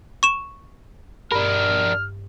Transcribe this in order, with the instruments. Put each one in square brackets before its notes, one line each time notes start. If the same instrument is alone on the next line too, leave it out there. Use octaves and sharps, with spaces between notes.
[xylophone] C#6 E7
[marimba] G2 [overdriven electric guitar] D4 A#4 [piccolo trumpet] F6